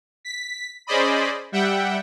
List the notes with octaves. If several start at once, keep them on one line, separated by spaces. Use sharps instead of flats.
B6
C#4 G#4 C5 D5 D#5 B5
G3 E5 F#5 G5